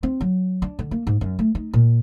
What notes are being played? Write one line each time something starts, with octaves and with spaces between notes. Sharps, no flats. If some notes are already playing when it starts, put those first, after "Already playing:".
C4
F#3
D4
D3
A#3
G#2
F#2
A3
D#4
A#2